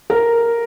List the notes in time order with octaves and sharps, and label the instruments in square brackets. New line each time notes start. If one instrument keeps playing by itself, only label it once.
[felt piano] A#4